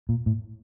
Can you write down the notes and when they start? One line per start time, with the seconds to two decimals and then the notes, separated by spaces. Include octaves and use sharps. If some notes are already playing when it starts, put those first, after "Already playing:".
0.09 A#2
0.26 A2